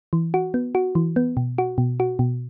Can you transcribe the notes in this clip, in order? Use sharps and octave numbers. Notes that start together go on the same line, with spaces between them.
E3
F#4
B3
F#4
E3
B3
B2
F#4
B2
F#4
B2